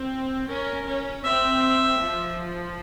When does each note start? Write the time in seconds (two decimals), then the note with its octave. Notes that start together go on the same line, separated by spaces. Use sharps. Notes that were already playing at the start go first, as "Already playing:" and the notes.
Already playing: C4
0.48 C#4 A#4
0.86 C#4
1.24 C4 E5
2.01 F3